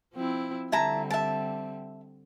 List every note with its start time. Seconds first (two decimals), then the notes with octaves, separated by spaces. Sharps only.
0.14 F3 C4 E4
0.72 D3 G3 C4 E4 A5 A#5
1.10 E5 A5